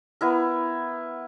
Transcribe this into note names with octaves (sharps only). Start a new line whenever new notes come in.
B3 E4 A#4